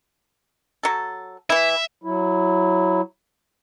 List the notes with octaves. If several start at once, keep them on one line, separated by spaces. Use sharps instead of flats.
F#3 A4
E3 E4 E5
F#3 E4